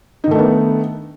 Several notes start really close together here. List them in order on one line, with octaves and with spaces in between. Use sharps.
D#4 D#3 A3 D4 B3